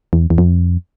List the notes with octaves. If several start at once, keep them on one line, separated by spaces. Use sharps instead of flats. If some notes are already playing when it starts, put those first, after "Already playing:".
E2
E2
F2